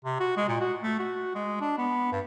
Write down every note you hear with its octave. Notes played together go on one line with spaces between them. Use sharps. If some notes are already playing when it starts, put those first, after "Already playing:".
C3
F#4
G#3
A#2
F#4
A3
F#4
G#3
D4
B3
G2